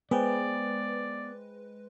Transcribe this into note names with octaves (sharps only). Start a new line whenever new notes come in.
G#3 B3 B4 C5 D5 G5 G#5